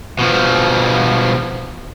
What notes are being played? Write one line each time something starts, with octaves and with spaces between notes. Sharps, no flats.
B2 F3